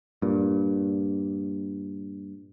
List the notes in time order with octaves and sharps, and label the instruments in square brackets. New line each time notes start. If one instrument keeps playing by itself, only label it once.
[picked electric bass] G2 A#2